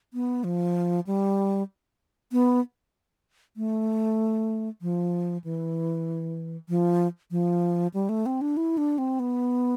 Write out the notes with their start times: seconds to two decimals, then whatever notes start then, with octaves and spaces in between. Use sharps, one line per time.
0.14 B3
0.44 F3
1.07 G3
2.32 B3
3.57 A3
4.82 F3
5.44 E3
6.69 F3
7.31 F3
7.94 G3
8.09 A3
8.26 C4
8.41 D4
8.57 E4
8.78 D4
8.98 C4
9.20 B3